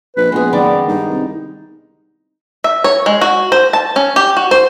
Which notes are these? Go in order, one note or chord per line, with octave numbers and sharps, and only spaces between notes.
A#1 B4
A#1 G#3 B3 G#4
F#1 D#3 B3 D5 D6
G2 D#4
C2
E5
C#5
G#3
F#4
C5
A5
C#4
G4
F#4
C5